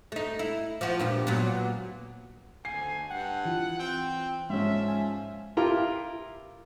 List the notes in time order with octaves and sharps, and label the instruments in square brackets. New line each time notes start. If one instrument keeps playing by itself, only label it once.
[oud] A3 D#4
E4
F3 F#4
G2 A#2 G4
A#2 F#3 B3
[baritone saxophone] D2 [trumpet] G#5 [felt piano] C7
[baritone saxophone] G2 [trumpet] F#5 [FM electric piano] G5
[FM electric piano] E3 F4
[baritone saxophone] C4 [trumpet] G5
[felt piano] G#2 C#4 [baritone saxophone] F3 [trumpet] E5
[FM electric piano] G#5
[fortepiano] E4 F4 G4 A#4 A#5